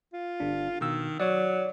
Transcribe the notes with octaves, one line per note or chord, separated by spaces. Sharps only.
F4
G1 D4
B2 D#3 E6
F#3 C#5 D5